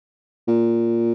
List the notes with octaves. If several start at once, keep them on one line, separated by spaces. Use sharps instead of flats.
A#2